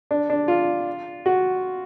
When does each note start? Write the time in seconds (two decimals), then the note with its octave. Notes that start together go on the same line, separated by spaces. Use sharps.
0.11 D4
0.30 D4
0.48 F4
1.26 F#4